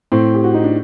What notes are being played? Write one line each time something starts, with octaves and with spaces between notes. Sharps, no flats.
A2 C4
G4
F#4
D#4
D4